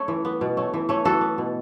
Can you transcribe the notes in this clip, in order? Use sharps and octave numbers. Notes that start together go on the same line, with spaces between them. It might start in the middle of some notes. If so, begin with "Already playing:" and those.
Already playing: A3 C#4
E3
B3
B2
A3 C#4
E3
A3 C#4
E3 F#4 A4
B3
B2